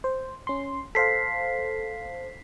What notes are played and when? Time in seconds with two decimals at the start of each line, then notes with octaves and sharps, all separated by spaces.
0.04 C5
0.47 C#4 C6
0.95 A4 C5 F5 B6 C7